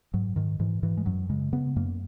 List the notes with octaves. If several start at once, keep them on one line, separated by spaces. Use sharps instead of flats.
G#2 F#3
G#2 D#3
G#2 E3
G#2 E3
G#3
F#2 F#3
C#3 G#3
C#3 B3
F#2 A#3